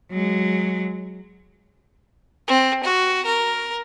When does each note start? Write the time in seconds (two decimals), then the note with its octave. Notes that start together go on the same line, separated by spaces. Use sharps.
0.11 F#3 G#3
2.48 C4
2.84 F#4
3.26 A#4